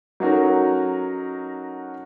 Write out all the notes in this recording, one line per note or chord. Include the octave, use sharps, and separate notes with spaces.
F#3 C#4 D#4 F#4 A4 A#4